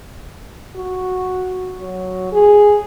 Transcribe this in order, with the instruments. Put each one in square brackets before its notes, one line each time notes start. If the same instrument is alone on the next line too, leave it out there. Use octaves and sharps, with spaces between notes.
[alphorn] F#4
F#3
G#4